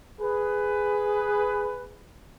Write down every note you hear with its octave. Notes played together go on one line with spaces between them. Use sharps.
G#4 B4